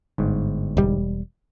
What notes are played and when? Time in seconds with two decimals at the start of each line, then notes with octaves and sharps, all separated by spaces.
0.18 G1 G#2
0.77 E1 G3